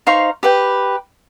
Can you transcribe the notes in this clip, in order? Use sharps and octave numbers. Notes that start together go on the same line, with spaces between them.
D#4 C5 F5 C#6
G4 B4 G5